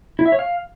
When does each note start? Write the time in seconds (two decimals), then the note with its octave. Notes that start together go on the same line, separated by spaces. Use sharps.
0.19 E4
0.26 E5
0.32 C#5
0.39 F5